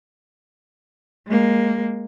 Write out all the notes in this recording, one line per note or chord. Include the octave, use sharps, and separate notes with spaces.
G#3 A#3